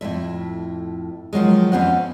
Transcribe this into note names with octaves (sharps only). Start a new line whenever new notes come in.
F2 A2 G#3 E5
D#3 F3 F#3 G#3
F2 B3 C#4 C5 F5 F#5